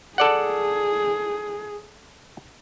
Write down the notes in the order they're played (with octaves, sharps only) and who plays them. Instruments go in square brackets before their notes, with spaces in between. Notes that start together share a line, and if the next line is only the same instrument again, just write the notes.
[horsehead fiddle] G#4 [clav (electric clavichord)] A4 D5 F#5